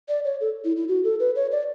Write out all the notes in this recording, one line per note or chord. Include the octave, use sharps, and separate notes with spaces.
D5
C#5
A4
E4
E4
F#4
A4
B4
C#5
D5